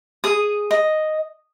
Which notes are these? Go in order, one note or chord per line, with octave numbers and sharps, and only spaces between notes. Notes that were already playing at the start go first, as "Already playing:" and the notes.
G#4 D#6
D#5